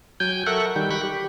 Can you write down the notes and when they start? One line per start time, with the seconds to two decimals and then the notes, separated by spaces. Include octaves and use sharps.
0.20 F#3 G5 G#5 G6
0.46 A4 A#4 E5 F#5 C#6 F#6
0.76 D#3 G3 G5
0.91 G5 B5 C#6 F#6
1.03 G4